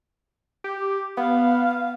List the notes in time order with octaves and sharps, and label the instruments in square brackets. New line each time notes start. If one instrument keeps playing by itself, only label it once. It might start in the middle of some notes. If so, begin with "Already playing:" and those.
[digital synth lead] G4
[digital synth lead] B3 [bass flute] F5